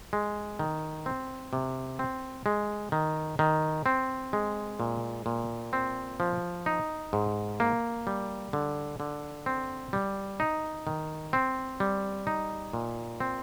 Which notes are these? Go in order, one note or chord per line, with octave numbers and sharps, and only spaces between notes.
G#3
D#3
C4
C3
C4
G#3
D#3
D#3
C4
G#3
A#2
A#2
C4
F3
D#4
G#2
A#3
G3
D3
D3
C4
G3
D#4
D#3
C4
G3
D#4
A#2
C4